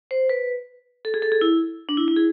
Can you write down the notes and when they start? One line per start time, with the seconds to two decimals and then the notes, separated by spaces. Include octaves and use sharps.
0.11 C5
0.29 B4
1.05 A4
1.14 G#4
1.22 A4
1.32 G#4
1.41 E4
1.89 D4
1.97 E4
2.08 E4
2.16 G#4